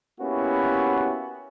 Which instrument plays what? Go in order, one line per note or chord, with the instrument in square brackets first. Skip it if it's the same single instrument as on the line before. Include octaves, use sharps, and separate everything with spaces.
[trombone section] A#3 B3 C#4 E4 F#4 G4